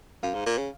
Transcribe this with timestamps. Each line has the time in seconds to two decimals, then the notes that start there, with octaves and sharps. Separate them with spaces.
0.23 F#2 F5
0.34 G#2
0.46 A#2
0.58 C#3